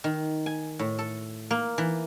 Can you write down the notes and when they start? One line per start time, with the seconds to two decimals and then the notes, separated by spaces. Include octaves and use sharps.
0.04 D#3
0.46 G#5
0.79 A2
0.99 A4
1.51 A#3
1.78 E3